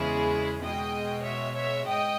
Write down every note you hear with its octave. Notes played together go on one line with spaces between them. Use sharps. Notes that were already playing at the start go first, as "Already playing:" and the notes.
Already playing: E2 C#3 G#3 E4 G#4
B2 G#3 D#5 G5
C#5 E5
C#5 E5
G#2 D#5 G5